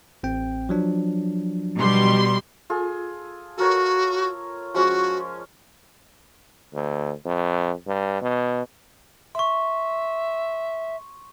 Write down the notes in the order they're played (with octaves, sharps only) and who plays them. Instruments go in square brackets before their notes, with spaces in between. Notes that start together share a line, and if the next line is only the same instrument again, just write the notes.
[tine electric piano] A1 C4 G5
F3 F#3 D4
[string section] B2 G3 C6
[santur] F4 G#4 A4
[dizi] F#4 [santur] A4 A#4 C#5
[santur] F3 G#3 C#4 [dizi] F#4
[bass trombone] D2
F2
G2
B2
[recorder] E5 [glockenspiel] C6 C#6